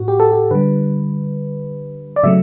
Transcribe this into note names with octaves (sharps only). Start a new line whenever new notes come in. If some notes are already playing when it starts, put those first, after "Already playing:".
Already playing: A2 F#4
G4
A4
G4
D3 G3 B4
D5
C#3 F#3 A3 E5